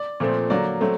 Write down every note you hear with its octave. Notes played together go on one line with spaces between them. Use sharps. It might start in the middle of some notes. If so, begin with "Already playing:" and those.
Already playing: D5
A#2 F3 A3 C4
D3 F#3 A#3 D5
F#3 A3 C4